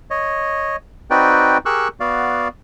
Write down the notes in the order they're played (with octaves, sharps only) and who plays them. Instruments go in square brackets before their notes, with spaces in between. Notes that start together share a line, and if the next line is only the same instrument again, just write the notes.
[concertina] C#5 D#5
C4 D#4 F#4 B4 D5 G5
G4 G#4 A#4 C#6 E6 F#6
B3 F#4 D5 F5